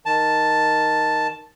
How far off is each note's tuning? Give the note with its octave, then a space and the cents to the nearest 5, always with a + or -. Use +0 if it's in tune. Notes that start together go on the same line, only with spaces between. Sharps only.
D#3 +0 A5 +0